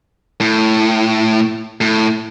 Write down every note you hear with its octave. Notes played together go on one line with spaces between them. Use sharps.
A2
A2